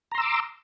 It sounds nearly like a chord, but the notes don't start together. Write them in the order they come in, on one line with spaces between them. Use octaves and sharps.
A#5 C6 E6 D6